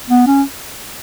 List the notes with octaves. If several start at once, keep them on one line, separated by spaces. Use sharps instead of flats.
B3
C#4